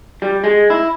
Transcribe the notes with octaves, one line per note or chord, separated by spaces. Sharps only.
G3
G#3
E4